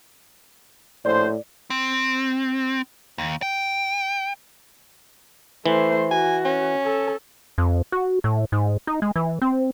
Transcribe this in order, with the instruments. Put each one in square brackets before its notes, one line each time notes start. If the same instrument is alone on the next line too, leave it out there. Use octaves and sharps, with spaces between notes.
[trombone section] A#1 C5 [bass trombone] A2 [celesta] D5
[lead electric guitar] C4
D#2
G5
[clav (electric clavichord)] E3 [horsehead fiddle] A3 C5
[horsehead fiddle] F#4 [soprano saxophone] G#5
[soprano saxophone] C#4
[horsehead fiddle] A4
[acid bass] F2
F#4
A2
G#2
D#4
G#3
E3
C4